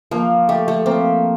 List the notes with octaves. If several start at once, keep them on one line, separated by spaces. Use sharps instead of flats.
F3 A#3
A3 G4
A3
A#3 C4